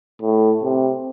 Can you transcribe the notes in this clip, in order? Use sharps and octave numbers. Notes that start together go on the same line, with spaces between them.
A2
C3